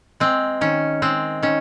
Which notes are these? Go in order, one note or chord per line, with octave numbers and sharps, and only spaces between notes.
G#3 C4
D#3 C#4
G#3 C4
D#3 C#4